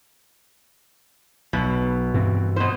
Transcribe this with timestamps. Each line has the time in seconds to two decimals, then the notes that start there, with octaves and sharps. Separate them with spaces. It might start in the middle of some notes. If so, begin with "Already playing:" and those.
1.53 B1 B2
2.14 G2 E3 C4
2.56 B2 C5